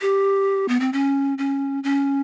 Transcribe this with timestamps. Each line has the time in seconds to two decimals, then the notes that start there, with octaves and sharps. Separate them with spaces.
0.01 G4
0.68 B3
0.80 C4
0.93 C#4
1.38 C#4
1.84 C#4